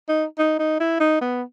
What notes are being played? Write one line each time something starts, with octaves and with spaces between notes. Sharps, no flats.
D#4
D#4
D#4
E4
D#4
B3